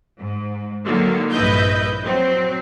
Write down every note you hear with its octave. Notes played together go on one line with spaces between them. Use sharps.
G#2
D3 D#3 F#3 A#3
A#1 G2 E4 B4 D#5 G6
F#3 C4